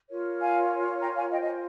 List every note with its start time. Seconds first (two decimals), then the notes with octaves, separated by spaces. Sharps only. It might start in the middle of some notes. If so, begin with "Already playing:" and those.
0.09 F4 A#4 C#5
0.40 F5 G#5
1.01 G5 A#5
1.16 F5 G#5
1.31 F4 C5 D#5 G5
1.42 D#5